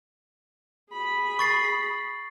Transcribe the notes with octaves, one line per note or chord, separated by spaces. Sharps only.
G#4 B5
C#6 A6 C7